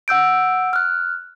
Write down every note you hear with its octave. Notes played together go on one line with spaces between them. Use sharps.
F#5 E6 G6 D7
F6 F#6